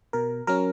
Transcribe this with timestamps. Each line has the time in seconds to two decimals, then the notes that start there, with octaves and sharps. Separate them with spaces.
0.13 B2 A#4
0.47 F#3 C#4 A#4